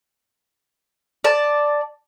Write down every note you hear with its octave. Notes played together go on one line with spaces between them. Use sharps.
D5 A5